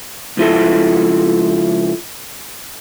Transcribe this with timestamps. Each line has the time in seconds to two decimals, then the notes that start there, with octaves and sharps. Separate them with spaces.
0.37 C#2 F3 E4 A4